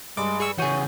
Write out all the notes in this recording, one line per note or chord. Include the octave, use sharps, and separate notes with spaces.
G2 G#3 D6
G#4 C#6 E6
C#3 E3 F#4 G#4 C#5 G6 D#7